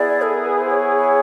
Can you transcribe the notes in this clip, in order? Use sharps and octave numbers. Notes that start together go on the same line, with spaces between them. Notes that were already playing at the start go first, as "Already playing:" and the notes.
Already playing: B3 E4 G#4 D5
A4
A#4
B4
C5
C#5